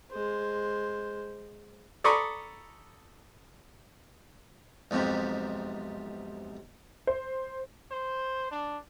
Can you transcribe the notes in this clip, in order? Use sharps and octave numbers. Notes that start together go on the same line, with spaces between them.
G#3 C5
A4 D5 A#5 B5 C#6 D#6
B1 F2 G#2 C3
C5
C5
D4